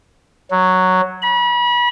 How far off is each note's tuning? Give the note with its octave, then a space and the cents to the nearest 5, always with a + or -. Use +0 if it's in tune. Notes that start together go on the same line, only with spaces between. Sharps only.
F#3 +0
B5 -35